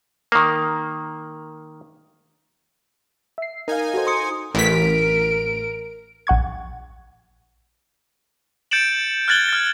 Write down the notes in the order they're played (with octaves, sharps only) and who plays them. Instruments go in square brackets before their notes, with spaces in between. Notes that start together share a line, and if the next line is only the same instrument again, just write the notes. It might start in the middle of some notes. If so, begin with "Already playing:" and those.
[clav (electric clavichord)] D#3 A#3
[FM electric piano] E5 C7
[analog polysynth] D#4 G#5 [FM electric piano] A#4 F5
[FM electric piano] F#4 A4 C5
[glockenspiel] C6 D#6 C#7
[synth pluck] A1 B6 [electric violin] A#4 D7
[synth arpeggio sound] A#1 F#5 C#6 G#6
[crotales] G6 A6 C#7 D7 E7 F#7
F6 F#6 G#6 A6 F#7 G7
F6 A6